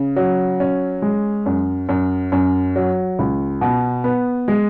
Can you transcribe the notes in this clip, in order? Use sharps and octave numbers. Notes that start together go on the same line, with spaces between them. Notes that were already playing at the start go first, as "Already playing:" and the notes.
Already playing: C#3
F#3
C#4
G#3
F#2
F#2
F#2
F#3
C#2
B2
B3
G#3